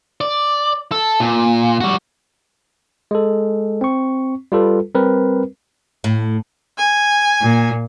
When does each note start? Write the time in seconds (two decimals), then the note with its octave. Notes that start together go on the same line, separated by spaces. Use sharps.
0.21 D5
0.92 A4
1.20 A#2
1.81 G3 F#4
3.11 G#3 A4
3.81 C4 C#6
4.52 G3 F4 A4 B4
4.95 G3 C4 A#4 B4
6.04 A2
6.78 G#5
7.41 A#2